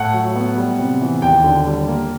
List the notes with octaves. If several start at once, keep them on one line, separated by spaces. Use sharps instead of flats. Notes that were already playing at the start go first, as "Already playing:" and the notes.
Already playing: A2 F#5
F#3
B3
G3
C3
E3
D#2 G5
D3
G3
A#3